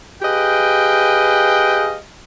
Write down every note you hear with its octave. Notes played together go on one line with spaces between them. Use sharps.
G4 G#4 B4 D#5 F5 G5